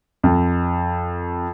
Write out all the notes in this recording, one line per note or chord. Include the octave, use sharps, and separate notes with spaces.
F2